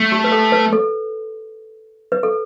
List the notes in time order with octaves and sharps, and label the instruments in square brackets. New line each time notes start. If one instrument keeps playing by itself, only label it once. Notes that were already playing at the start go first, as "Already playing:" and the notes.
Already playing: [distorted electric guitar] A3
[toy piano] G4
B4
A4
B4
A4
B4
A4